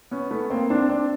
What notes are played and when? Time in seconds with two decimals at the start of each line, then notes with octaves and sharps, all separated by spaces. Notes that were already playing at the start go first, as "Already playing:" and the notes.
0.11 B3 C#4
0.31 A3 B3
0.50 A#3 C4
0.70 C4 D4
0.89 C4 D4